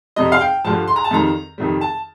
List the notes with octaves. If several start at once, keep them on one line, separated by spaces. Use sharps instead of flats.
F2 C3 G3 D#5
F5
G5
G2 D3 F3 A5
C6
A#5
A5
F2 D#3 G3 A#5
F2 C3 D#3 G3
A5